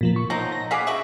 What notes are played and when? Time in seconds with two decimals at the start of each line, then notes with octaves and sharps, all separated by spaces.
0.01 A#2 F3 A#3
0.16 C#6
0.30 F3 F#3 D#4 A#6
0.52 A#6
0.71 G#4 F5 F#5 D6 B6
0.87 C#3 G#3 F#4 E5